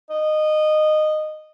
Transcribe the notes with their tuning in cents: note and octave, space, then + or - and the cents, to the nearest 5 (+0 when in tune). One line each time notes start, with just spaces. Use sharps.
D#5 -15